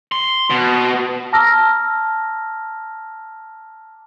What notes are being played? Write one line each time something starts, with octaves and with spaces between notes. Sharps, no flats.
C6
B2
A5 A#5 D6 E6 F6 A#6